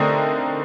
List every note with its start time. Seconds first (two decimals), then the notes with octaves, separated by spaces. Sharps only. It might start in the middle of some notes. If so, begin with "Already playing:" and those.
Already playing: D3 A3 C4 D#4 A#4